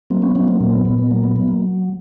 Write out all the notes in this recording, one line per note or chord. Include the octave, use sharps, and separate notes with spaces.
F#3 A#3 C4
B3 C#4
F#3 B3 C#4
A#3 C4
A#2 A#3 C4
B3
A#2 B3
B3
F#3 A#3
B3
F#3 B3
A#3